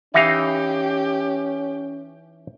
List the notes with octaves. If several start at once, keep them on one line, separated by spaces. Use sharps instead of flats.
E3 C#4 D#4 G4 E5 F5